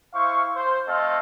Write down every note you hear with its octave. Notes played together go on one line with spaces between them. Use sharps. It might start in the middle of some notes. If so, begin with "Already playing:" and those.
E4 C5 F5 C#6
C5
A3 C4 A4 D#5 F5